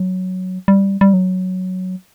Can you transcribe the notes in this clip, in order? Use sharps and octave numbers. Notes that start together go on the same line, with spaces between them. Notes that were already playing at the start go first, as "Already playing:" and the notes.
Already playing: F#3
G3
G3
F#3